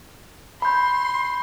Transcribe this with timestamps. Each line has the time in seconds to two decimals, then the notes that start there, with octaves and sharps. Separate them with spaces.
0.62 B5 C6 G6